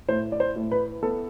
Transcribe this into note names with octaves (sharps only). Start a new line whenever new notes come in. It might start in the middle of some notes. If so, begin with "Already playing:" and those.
A2 C5
D5
C5
A2
B4
B3 A4